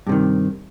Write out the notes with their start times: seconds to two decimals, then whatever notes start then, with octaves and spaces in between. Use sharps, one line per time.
0.07 G2
0.09 C3
0.12 D#3